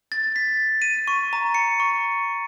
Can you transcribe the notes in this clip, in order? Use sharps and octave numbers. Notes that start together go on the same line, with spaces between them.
A6
B6
D#7
C#6
A#5
C#7
C#6